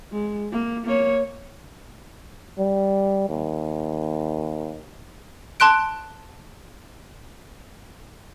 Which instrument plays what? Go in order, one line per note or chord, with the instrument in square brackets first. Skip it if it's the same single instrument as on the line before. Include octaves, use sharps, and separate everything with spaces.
[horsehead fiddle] G#3
A#3
A#3 C#5
[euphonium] G3
D#2
[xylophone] A5 C6 F#6 D7